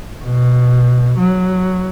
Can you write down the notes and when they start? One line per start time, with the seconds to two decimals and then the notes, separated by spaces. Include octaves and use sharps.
0.23 B2
1.18 F#3